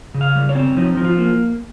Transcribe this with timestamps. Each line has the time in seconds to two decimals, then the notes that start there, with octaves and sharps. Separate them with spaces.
0.14 C#3
0.21 F5
0.35 G3
0.49 C#5
0.55 C4
0.77 F3 D#4
0.96 F3 D#4
1.04 F4
1.18 A#3